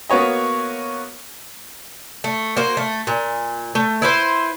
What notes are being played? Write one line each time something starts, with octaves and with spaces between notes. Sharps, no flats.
A#3 B3 F#4 C#5 D#5
A3
A#3 F#4 C5
A3
A#2
A3
E4 B4 C5